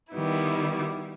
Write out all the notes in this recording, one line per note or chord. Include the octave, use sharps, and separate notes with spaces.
D#3 G3 B3 E4